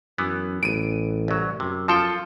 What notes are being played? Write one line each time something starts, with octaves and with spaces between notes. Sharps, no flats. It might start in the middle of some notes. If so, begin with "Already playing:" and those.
F#2 E3 B3
A1 D7 D#7
C2 F#3
F#2 C3
F3 F4 A4 G5 A5